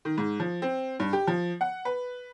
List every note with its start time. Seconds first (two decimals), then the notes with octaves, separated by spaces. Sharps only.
0.05 D#3
0.18 G#2
0.40 F3
0.62 C4
1.00 G2
1.13 G4
1.27 F3
1.61 F#5
1.85 B4